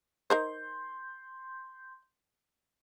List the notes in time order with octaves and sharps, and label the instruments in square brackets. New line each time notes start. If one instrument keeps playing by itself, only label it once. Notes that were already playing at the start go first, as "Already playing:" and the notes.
[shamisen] D#4 A#4 C5 [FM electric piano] C6 G6